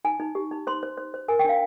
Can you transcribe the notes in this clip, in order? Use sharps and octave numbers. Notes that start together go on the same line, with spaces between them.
D#4 G#5
D#4
G4
D#4
C5 C6
C5
C5
C5
A#4 G#5
G5
D4 F5